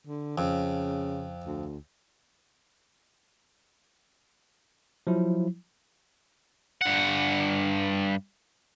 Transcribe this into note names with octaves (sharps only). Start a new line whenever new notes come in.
D3
F2 C#3
D2
F3 F#3 E4
G2 F#5